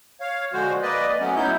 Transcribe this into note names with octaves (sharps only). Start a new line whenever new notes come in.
C#5 F5
D3 F3 G#3 F#4 C5
A#3 B4 D5 D#5
F#3 A3 B3 C#4
F#3 B3 D#4 E4 G6